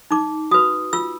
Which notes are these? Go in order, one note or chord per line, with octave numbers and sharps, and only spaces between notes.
D#4 D6
F#4 B4 D#6
F4 E6